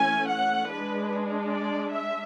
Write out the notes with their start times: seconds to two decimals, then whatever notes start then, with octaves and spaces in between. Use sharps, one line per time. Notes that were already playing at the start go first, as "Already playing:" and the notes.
Already playing: E3 A3 C#4 G#5
0.29 F#5
0.69 G#3 D4 B4
1.52 D5
1.93 E5